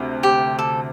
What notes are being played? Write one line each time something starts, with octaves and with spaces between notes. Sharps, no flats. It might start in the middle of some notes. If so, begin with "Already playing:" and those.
Already playing: D2 C3
G4
A4